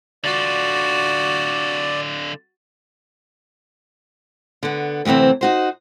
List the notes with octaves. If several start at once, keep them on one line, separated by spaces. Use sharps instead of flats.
D3 F4 F#4 D5
D3 B3
D2 C3 D#3 E3 C4
D#4 F#4 C5